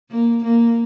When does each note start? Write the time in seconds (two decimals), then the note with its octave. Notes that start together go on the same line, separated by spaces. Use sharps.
0.11 A#3
0.44 A#3